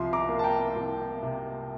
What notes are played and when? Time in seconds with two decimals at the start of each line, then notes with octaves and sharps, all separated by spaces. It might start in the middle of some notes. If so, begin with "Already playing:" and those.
Already playing: C2 C3 F3 C6
0.13 A#5 D6
0.29 A#3
0.39 A5
0.44 G5 A#5
0.76 C2
1.23 C3